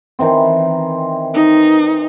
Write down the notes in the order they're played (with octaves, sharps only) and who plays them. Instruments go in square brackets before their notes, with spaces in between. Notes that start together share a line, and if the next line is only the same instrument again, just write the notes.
[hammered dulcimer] D#3 E3 C4
[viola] D#4